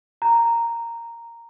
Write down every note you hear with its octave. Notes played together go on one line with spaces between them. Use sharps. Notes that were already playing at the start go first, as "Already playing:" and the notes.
A#5